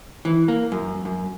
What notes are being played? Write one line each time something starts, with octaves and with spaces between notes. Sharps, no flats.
E3
A#3
F#2
F#2